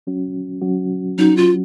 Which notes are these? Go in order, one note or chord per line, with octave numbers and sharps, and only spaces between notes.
F#3 C#4 F#4
F#3 C#4 F#4
F#3 C#4 D#4 F#4
F4